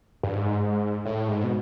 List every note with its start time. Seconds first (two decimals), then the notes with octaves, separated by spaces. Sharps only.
0.23 G2
0.35 G#2
1.05 A2
1.28 G#2
1.44 B2